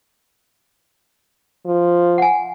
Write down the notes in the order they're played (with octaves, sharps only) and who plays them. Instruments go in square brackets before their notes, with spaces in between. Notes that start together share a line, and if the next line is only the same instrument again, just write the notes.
[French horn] F3
[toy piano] F#5 G#5